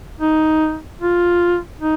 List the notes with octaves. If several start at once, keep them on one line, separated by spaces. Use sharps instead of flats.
D#4
F4
D#4